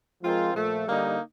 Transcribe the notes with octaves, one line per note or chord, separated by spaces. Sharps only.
F3 G#3 C4 F4 A#4
A#2 F3 A3
D3 G3 A#3 D#4